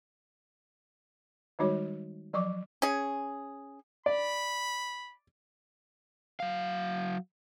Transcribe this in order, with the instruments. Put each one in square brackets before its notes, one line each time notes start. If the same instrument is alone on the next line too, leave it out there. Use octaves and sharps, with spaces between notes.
[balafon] D#3 G3 G#3 D#4 F#4 C#5
F3 F#3 D5 C#6 D6
[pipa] C#4 G#4
[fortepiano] D5 [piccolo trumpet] B5
[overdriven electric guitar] F#3 F5